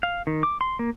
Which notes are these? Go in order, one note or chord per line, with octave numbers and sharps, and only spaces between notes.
F5
D#3
D6
C6
A#3